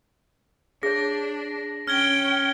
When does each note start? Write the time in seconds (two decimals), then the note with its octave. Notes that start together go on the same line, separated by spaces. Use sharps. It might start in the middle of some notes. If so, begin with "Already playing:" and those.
0.83 D4 G#4 C#5 A#6
1.87 C#4 G5 F6 G#6 G7